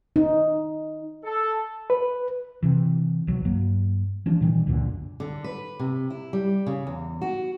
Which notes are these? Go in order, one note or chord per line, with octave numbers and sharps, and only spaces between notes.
D#4
A4
B4
C3 E3
B1 F#3
G2 F#3 A#3
E3 F3 G3 D4
A#2 D#3 E3 G3
C#2 F#2 A#2 D3
D3
B4
C3
E4
G3
C#3
E2
F#4